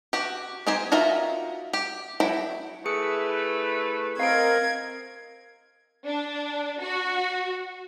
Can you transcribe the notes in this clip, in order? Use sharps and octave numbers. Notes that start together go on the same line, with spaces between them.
F#4 G4
C4 D#4 G4 C5 G#5
D#4 F4 F#4 A#4 E5
G4
F#3 E4 G5
A3 E4 G#4 B4 C#7
C4 A#4 D#5 F5 G#6 D7
D4
F#4